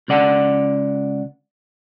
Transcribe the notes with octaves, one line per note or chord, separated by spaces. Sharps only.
C#2 C#3 D5 F#5